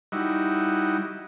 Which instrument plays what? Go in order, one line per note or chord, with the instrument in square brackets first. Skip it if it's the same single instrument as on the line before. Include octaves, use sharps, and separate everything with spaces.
[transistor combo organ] G3 D#4 E4 F#4